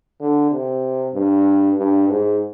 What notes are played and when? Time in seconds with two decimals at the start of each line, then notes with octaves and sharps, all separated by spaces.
0.20 D3
0.51 C3
1.14 G2
1.77 G2
2.09 G#2